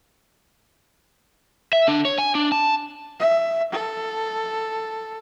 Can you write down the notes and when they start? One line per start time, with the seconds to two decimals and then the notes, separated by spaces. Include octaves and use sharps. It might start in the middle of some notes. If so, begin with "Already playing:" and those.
1.73 E5
1.87 D3 D4
2.05 C#5
2.18 G#5
2.35 D4
2.52 A5
3.20 E5
3.72 A4